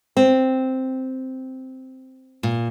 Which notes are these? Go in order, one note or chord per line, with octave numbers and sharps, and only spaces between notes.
C4
A#2